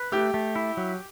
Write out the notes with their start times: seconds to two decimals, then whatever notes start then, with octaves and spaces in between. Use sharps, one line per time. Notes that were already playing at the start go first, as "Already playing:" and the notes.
Already playing: B4
0.12 A3 G4
0.34 A3
0.56 E4
0.77 F#3